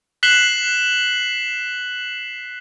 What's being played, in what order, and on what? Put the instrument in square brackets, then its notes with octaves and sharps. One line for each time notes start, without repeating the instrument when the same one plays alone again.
[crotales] F#6 B6 C7 E7 F#7 G7